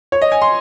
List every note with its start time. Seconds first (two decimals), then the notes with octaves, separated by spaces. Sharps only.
0.12 C#5
0.22 D#5
0.32 G#5
0.42 C6